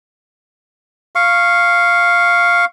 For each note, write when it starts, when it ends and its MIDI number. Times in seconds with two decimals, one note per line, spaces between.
1.15 2.65 77
1.15 2.65 85